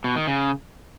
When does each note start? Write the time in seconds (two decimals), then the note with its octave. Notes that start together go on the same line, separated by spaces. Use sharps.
0.04 B2
0.16 D#3
0.27 C#3